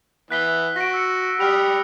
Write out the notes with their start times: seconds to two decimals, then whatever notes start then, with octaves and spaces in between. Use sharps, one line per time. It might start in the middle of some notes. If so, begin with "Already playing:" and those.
0.31 E3 B3 F#6 B6 G7
0.76 F#4 A#6 D7
0.94 E6 C#7
1.40 G4 G5 B5 D#6 F6 F7